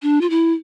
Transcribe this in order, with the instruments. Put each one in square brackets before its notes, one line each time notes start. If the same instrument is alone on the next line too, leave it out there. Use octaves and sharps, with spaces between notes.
[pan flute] D4
F4
E4